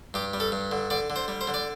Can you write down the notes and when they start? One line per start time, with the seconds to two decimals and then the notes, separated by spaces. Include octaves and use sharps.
0.14 G2 G4
0.33 G3
0.40 A4
0.52 G2
0.71 D3
0.90 D3 D5
1.10 D3
1.16 C5
1.28 G3
1.41 C5
1.47 D3
1.54 D5